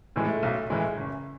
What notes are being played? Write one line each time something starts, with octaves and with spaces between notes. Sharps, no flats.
A2 E3 G#3
A3
B1
A2 E3 G#3
F#1